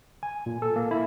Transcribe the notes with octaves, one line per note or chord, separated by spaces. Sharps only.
G#5
A#2
A4
A#3
E4